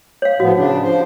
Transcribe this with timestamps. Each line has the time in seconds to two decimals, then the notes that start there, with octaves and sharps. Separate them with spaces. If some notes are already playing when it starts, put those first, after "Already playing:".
0.22 C#5 F5
0.40 A2 F3 B3 F#4
0.57 C#3 D4
0.83 F3 C5